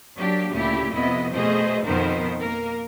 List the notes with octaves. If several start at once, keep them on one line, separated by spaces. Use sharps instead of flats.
F#3 A#3 D4 G4
D2 A#2 C#3 A3 E4 G4
F2 C3 B3 E4 D#5
B2 A3 G#4 C5 D#5
F2 B2 D#3 B3 A#4 C5
A#3 A#4